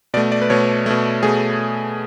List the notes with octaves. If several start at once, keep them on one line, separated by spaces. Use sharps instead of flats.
B2 A3 D5
D5
B4
B2 A3 C#5
B2 A3
B2 A3 G#4